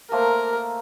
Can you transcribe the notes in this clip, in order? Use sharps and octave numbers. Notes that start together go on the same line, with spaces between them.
A3 A#3 A#4 C5